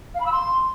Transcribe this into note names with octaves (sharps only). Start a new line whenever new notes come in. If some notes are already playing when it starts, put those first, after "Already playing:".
F5
B5
E6
C6